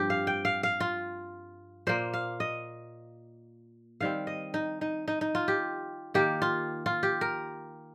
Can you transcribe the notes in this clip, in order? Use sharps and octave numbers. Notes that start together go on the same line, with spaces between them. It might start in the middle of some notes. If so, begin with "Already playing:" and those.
Already playing: G2 F3 C4 G4
F5
G5
F5
F5
F4
A#2 A#3 C5
F5
D#5
D#3 G3 C4 F5
D#5
D#4
D#4
D#4
D#4
F4
G4
D#3 A#3 G4
F4
F4
G4
A#4